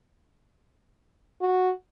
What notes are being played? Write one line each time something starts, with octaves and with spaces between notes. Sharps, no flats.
F#4